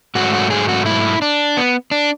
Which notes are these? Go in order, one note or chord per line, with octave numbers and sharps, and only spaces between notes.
G#2 F#3 A3 F#4
F#4
G#4
F#4
E4
D4
B3
D4